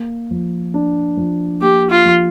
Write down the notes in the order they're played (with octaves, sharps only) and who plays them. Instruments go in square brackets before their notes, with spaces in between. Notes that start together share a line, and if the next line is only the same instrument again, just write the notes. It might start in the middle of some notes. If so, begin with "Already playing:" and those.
Already playing: [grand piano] A#3
F3
D4
F3
[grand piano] A#3 [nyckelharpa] G4
[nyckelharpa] F4
[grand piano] F3